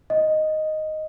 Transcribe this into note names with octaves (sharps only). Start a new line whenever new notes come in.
D#5